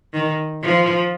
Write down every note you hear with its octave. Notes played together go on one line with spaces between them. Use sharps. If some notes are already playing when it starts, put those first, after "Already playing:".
D#3
F3